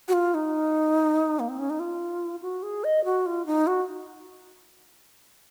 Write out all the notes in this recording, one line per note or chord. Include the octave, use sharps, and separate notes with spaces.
F#4
F4
D#4
A#3
C4
C#4
D#4
F4
F#4
G#4
D#5
F#4
F4
D#4
F#4